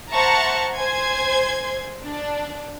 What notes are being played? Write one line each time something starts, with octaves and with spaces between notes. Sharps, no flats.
C5 E5 F#5 A5 A#5 C#6
C5 G#5 C6 G#6
D4